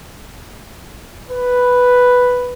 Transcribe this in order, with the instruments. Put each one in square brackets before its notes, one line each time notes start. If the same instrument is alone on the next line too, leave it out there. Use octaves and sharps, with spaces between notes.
[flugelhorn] B4